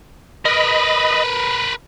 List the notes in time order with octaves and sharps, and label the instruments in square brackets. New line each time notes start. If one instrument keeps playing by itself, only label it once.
[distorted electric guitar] A#4 B4 [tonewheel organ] D#5 B5
[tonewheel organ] B5